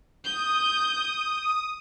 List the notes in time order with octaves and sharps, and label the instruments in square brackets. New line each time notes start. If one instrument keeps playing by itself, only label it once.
[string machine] D#6 [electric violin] G6